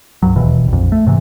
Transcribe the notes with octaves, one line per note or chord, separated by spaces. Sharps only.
C#2 G2 F#3
E1 D#2 B2 E3
A#1 F2
A3
G#2 C3 E3